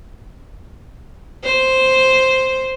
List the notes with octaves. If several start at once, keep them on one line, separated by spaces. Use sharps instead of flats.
C5